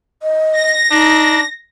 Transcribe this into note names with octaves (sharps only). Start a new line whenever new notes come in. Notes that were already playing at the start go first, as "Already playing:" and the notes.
D#5
A#6
D4 D#4